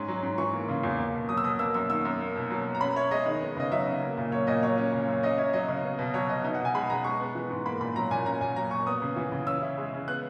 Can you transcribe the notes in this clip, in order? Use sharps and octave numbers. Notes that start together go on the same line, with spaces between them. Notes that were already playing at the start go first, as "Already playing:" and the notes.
Already playing: G#2 C#4
F#3
G#2
E3 C#6
A#3
C#3
E2
A#3
B2
F#3 D#6
E6
B2 D#6
A#3 E6
F#2 E6
D#3 E6
F#2
A#3
B2
F#3
B2
A#5
C#4 B5
E4 C#5
G#3 D#5
D#3
B3
C#3 D#5
F#3 E5
C#3
A#3
A#2
F#3 C#5
A#2 D#5
F#3 C#5
C#4
C#3
F#2
C#4 D#5
E4 C#5
F#3 D#5
C#3
B3
B2
F#3 C#5
B2 D#5
D#4 E5
F#5
B2
G#5
G#3 B5
B2 A#5
G#3 C#6
B3
E3
G#2
A#3 B5
A#2 B5
F#3 A#5
A#2 G#5
C#4 A#5
A#2 G#5
F#3 A#5
A#2 C#6
B3 D#6
C#3
E3
C#3
C#4 E6
E4
G#3
C#3
B3 F#6